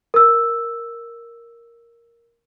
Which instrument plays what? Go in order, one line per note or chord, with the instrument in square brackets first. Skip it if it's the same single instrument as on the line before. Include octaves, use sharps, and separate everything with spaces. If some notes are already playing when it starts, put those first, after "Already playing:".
[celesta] A#4 E6